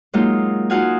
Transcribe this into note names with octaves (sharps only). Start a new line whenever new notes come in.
F#3 G#3 A#3 D#4 F4
D#4 F4 F#4 F5 F#5 G#5